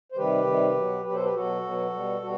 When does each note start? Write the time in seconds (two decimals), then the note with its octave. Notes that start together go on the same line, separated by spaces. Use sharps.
0.12 C5
0.17 C3 D#3 G3 G4 B4
0.46 C3 D#3 G3
0.76 B2 F#3
1.05 B2 F#3 G4 B4
1.14 A4 C5
1.24 G4 B4
1.34 B2 F#3 F#4 A4
1.64 B2 F#3
1.93 B2 G3
2.22 B2 G3 F#4